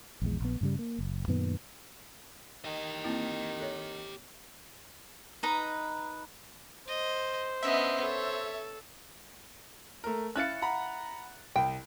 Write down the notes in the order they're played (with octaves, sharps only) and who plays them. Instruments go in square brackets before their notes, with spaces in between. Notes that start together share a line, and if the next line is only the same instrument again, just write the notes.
[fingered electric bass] A#1 E2 G#3
A#1 B3
G2 C#3 G3
A#3
F#1
F#2 A#2 D#3 B3
[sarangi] D#3 [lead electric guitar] G4 D#5
[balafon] A#3 C4 E4
A4 C#5
[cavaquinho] D#4 B4 D#5 A#5
[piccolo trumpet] C5 [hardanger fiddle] D#5
[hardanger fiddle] B3 D4 [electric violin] C#4 D#5 [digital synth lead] E5
[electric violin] A4 [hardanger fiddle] C#5
[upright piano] A3 A#4
[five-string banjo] C#4 E4 F5 [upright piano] F#6 A6 C#7
[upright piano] F#5 A#5 B5
[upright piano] C2 [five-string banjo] G5